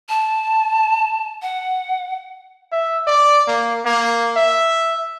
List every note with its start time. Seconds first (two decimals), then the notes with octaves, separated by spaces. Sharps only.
0.09 A5
1.42 F#5
2.72 E5
3.07 D5
3.47 A#3
3.85 A#3
4.36 E5